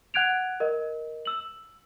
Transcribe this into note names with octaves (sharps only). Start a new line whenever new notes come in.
F#5 F#6 G#6 D7 F7
A#4 D#5
E6 F#7